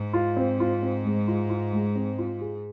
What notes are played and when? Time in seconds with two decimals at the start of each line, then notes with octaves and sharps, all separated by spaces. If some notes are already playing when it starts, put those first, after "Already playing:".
Already playing: G#2
0.13 F4
0.37 C4
0.60 F4
0.82 C4
1.05 G#3
1.28 F4
1.50 F4
1.73 G#3
1.95 C4
2.18 F4
2.41 G#4